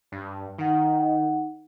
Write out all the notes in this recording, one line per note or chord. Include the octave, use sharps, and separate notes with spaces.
G2
D#3 D#4 F#5